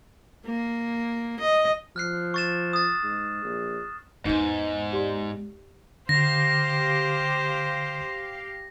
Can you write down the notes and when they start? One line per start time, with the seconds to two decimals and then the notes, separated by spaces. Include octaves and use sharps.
0.46 A#3
1.41 D#5
1.96 F3 F6 F#6 C7
2.34 C#6 A6 E7
2.73 D#6 A6
3.03 G#2
3.45 A#1
4.25 E2 G#2 G#3 B3 D#4 G6
4.93 G4 D5 C6
6.09 D3 G4 C5 F5 A#6